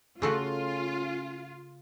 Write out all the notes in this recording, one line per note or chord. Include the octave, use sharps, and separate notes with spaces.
C#3 A3 C#4 F4 F#4